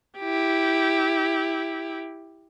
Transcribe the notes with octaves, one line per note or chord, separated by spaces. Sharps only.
E4 G4